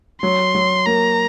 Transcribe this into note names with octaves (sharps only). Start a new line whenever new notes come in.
F#3 C6
F#3
A#3 A#5